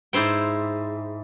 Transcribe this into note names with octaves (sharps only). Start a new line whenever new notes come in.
G#2 E4 C5 G5